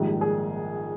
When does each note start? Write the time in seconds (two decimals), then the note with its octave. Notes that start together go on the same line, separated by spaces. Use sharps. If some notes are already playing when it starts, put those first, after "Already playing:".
Already playing: A#1 G#2 D#3 G3
0.21 G#4